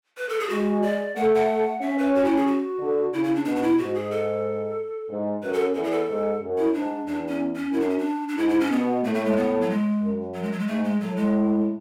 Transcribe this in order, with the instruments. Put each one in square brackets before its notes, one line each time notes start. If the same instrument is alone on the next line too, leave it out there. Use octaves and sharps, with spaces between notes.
[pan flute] B4
A4
G#4
[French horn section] G#3 [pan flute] F#4
[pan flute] D5
[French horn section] A3 [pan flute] F#5
[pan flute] F#5
[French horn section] C#4 [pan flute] E5
[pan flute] B4
F#4
E4
G#4
F#4
[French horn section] D3
[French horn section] C#3 [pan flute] E4
[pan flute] E4
D4
[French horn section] B2 [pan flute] D4
[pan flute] D4
E4
[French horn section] G#2 [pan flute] F#4
[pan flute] G#4
A4
[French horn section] G#2
[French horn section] F#2 [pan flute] B4
[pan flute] A4
[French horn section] E2 [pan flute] A4
[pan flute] G#4
A4
[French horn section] G#2
F#2
[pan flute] E4
[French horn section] G#2 [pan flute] D4
[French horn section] E2 [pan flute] D4
[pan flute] C#4
C#4
[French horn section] F#2 [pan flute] E4
[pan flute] D4
C#4
D4
D4
[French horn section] G#2 [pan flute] E4
[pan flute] E4
C#4
[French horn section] B2 [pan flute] B3
[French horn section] A2 [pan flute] A3
[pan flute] A3
G#3
B3
F#3
G#3
[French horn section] F#2
[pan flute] F#3
G#3
F#3
G#3
[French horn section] G#2 [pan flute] A3
[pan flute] G#3
[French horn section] A2 [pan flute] F#3
[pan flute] G#3